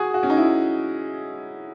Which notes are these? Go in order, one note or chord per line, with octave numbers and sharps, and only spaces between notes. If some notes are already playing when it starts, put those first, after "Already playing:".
Already playing: F#4 G#4
F#4
C#4
D#4
E4